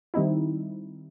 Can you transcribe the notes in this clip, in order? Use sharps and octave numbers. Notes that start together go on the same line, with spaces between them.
D#3 G3 C4 D#4 E4